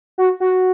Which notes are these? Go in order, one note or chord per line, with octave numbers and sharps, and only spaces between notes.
F#4
F#4